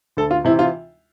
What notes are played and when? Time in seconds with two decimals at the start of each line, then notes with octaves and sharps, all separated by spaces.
0.17 D2 A4
0.31 F4
0.45 C3 E3 E4
0.59 F4